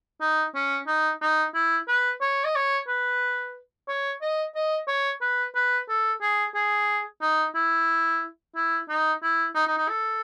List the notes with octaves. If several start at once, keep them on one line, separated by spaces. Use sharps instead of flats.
D#4
C#4
D#4
D#4
E4
B4
C#5
D#5
C#5
B4
C#5
D#5
D#5
C#5
B4
B4
A4
G#4
G#4
D#4
E4
E4
D#4
E4
D#4
D#4
D#4
A4